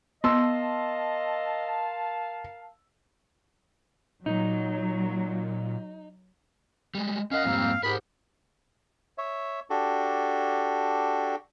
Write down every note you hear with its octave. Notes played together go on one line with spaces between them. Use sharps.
B3 A#4 D#5 F5 A5 C6 E6
A#2 F#3 D#4
G3 G#3
C#4 A#4 D#5 F5 F#5
F2 G#2 G3 A#3 C4
G#2 B3 G4 G#4 A#4 B5
C#5 E5
D4 F#4 G4 A4